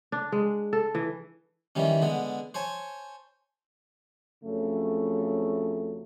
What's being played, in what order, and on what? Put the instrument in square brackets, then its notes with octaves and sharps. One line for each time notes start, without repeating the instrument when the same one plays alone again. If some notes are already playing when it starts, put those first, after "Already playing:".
[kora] D4
G#3
A4
E3
[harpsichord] D#3 E3 G3 C#4
D3 G#3 B3
C5 C#5 G#5 A5
[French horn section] F2 C#3 F#3 A3